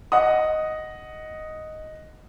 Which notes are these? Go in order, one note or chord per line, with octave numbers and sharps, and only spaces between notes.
D#5 F#5 D#6